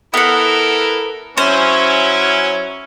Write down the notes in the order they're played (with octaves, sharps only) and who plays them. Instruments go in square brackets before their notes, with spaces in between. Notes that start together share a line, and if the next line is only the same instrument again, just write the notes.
[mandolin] B3 F#5 [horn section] E4 A4 A#4
[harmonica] F#3 E4 [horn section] C#4 [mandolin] C5